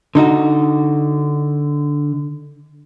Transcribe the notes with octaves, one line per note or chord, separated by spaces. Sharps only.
D3 D#4 F#4